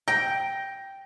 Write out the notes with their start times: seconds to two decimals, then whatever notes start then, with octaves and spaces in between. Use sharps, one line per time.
0.08 G5 A#6